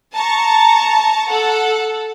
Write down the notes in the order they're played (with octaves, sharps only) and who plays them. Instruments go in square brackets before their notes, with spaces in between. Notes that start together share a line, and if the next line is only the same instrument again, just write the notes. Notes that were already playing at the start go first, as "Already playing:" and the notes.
[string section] A5 A#5 C#6
A4 F#5